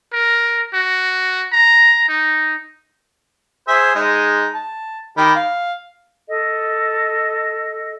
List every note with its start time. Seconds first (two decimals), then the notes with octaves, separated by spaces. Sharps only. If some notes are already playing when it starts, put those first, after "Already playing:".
0.13 A#4
0.74 F#4
1.52 A#5
2.08 D#4
3.68 G#4 C5 E5
3.95 G#3 D#4
4.54 A5
5.17 D#3 G4 B5
5.36 F5
6.28 A4 D#5